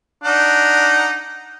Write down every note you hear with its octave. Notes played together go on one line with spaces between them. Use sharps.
D4 D#4 F#5